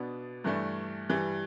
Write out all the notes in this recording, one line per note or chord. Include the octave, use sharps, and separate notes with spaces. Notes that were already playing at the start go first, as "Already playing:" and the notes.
Already playing: B2 B3 D4
G2 E3 A3 D4
G2 E3 G3